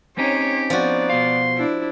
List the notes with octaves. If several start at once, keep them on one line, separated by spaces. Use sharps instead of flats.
C4 C#4 D#4 G4 C#5
F3 B3 F#4 D5
B2 F5 C6
D4 E4